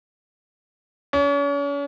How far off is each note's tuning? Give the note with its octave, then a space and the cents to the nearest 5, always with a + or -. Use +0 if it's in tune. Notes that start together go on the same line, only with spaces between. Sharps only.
C#4 +40